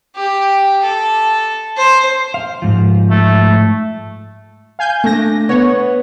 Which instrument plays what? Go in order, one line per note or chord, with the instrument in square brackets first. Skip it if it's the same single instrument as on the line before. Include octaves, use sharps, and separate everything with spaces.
[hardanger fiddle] G4
A4
C5
[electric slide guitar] F5
G#2 F3
[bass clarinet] A3
[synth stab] F5 G#5 G6
[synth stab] A3 A#6 [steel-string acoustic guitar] D4
[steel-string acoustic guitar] B3 [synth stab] C#5